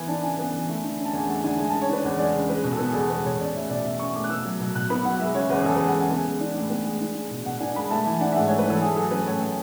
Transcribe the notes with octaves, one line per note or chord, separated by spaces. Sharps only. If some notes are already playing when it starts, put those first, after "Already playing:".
Already playing: E3 B3 G#5
D4 A5
C#3 G#5
B3
E3
A3
D3
C#4
A5
E2 G#5
A3 F#5
D3 G#5
G#3 G#5
C#3 A5
C#5
D4 B4
E2
G#3 D5
C#3
G#3 B4
B2
A4
B3
G#4
E2 A4
G#3 B4
B2 C#5
C#4 D5
A3 E5
B2 D5
B2 E5
C#4 C#6
A3 D6
F#6
B3 E6
F#3
B2
B2 F#6
B3 B5
F#3 F#5
G#3 E5
C#3 C#5
E2 B4
G#4
E2 A4
G#3 B4
F#5
C#3 G#5
B3 G#5
G#3
D4
A2
B3
G#3
D4
G#3
B2
B2 F#5
D4 G#5
G#3 B5
A3 A5
E3 G#5
D4 F#5
E5
G#2 F#5
A3 C#5
B4
E3 A4
A3 G#4
F#3 A4
C#4 B4
A2 C#5
A3